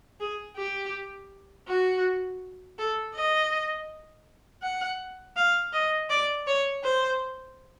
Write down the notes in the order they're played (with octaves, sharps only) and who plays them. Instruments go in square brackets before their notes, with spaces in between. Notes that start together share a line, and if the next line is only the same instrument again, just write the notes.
[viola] G#4
G4
F#4
A4
D#5
F#5
F5
D#5
D5
C#5
C5